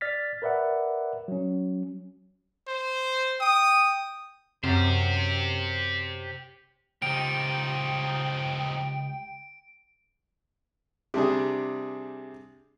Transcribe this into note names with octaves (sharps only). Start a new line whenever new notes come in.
D5 F6 A6 B6
A#4 B4 D5 E5 F#5
F#3 C#4
C5
G5 D#6
F#2 C3 G4 C5
C#2 F3 D#4 G4 G5 D7
C3 G3 D4 G#4